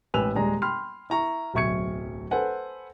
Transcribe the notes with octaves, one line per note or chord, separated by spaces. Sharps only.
A1 G#2 B4 G#5 E6 F7
D#1 G#3 D5 A#5
G5 B5 C6 F6
E4 A#5 C#6
D1 B1 E5 C#6 G#6 C#7
A4 B4 C5 F#5 G#5